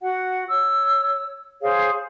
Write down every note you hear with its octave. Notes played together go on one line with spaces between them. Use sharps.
F#4 F#5
C#5 E6
G#4 C5 C#5 F5